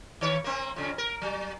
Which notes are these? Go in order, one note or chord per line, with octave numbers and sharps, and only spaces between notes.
D#3 C#5
A#3 C4
F2 C#3 C#4
A#4
F#3